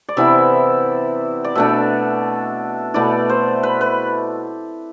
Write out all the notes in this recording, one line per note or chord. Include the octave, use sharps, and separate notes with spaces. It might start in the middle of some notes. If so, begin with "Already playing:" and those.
D5
C3 E3 B3 E4 E5
D5
B2 A3 D4 E5
B2 A3 E4 D5
C5
B4
B4